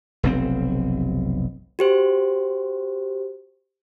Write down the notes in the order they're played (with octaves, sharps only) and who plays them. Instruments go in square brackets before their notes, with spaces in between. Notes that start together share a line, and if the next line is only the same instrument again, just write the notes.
[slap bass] F1 B1 C4
[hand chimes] F#4 G4 C5